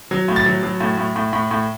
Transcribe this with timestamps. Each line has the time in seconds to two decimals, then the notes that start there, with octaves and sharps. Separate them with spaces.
0.11 F#3
0.28 A2
0.36 A6
0.46 F#3
0.63 F#3
0.80 A2
0.98 A2
1.16 A2
1.33 A2
1.51 A2